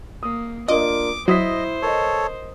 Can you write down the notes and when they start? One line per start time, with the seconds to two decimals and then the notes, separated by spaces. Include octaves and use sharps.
0.23 A#3 D#6
0.68 A#3 D4 F4 D#5 D6
1.28 F#3 E4 C5 D#5 D#6 B6
1.82 A4 A#4 C#5 D#5